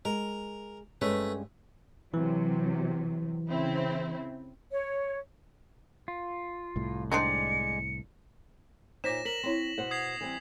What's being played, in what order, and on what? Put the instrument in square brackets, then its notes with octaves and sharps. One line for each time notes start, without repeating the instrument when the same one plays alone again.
[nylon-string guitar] G#3 [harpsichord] A#4
[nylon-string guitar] G2 G#3 C#4 [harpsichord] A3 B4
[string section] C3 F#3 [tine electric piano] E3
[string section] C#3 C4 E4
[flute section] C#5
[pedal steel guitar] F4
[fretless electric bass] C2 A2
[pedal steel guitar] G#3 D5 [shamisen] C4 D4 D#4 [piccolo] C#7
[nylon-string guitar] A#2 D#4 [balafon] C5 C#5 D6 [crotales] A#6 B6 E7
[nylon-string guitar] A#4 [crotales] B6 F#7
[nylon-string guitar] C4 C#5 [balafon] E4 C6
[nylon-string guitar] B2 C5 F#5
[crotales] D#6 G#6 C7
[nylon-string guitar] E3 G3 C4